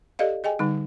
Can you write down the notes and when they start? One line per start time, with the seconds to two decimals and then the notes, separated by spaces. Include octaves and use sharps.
0.19 G4 A4 D5 D#5 F5
0.44 G#4 D#5 G5 G#5
0.59 D3 G3 D#4